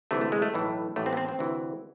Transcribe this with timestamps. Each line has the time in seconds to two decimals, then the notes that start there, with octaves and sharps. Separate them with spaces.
0.11 D2 C3 E3 A3
0.21 A3
0.32 G#3
0.42 A3
0.54 B1 A2 E3
0.96 A1 A2 E3 A3
1.06 C4
1.13 B3
1.17 C4
1.29 C4
1.39 D2 C3 E3